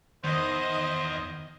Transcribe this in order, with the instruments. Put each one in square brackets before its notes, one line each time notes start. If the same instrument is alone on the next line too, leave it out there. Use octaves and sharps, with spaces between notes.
[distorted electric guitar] E2 [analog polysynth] D#3 [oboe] C5 [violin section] D#5